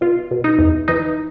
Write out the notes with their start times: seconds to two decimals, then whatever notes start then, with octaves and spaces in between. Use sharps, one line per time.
0.01 B2 F4
0.31 B2
0.44 D#4
0.59 E2
0.88 E3 D#4